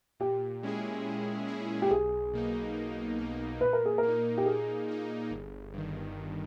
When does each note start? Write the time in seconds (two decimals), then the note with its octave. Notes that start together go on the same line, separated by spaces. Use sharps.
0.20 A#2 G4
0.63 G#3 C#4 E4 G#4
1.06 A#2
1.48 G#3 C#4 E4 G#4
1.82 G4
1.90 B1 G#4
2.33 B2 A#3 D#4
2.75 B1
3.18 B2 A#3 D#4
3.61 A#2 B4
3.73 A#4
3.86 G#4
3.98 A#3 A#4
4.08 D#4
4.38 G4
4.46 A#2 G#4
4.88 A#3 D#4
5.31 G1
5.74 G2 D#3
6.16 G1